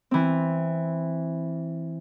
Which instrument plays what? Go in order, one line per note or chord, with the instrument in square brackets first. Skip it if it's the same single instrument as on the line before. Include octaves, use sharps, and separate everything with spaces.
[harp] E3 C4